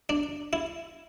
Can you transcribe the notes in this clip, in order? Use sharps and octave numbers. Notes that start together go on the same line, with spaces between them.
D4
E4